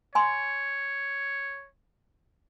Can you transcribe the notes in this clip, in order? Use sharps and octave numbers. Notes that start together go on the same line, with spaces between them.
C#5 G#5 C6